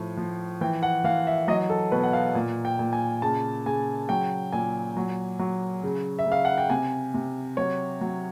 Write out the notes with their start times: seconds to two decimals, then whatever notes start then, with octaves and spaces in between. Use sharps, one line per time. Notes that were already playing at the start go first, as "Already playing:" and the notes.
Already playing: A2 F3
0.17 F3
0.61 E3 G5
0.83 F#5
1.04 E3 F5
1.27 E5
1.48 F#3 D#5
1.70 A4
1.92 B2 B4
2.03 F#5
2.13 F5
2.35 A#2
2.65 G5
2.79 A#2
2.93 G#5
3.22 C#3 A5
3.66 C#3 G#5
4.09 F#3 G5
4.52 A#2 G#5
4.97 F#3
5.39 F#3
5.83 C#3
6.19 E5
6.26 C#3
6.32 F5
6.45 F#5
6.58 G5
6.70 C3 G#5
7.14 C3
7.57 F#3 C#5
8.01 F#3